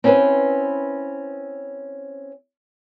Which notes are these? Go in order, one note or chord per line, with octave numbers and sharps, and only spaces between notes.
C4 C#4 E4 G#4 B4 C5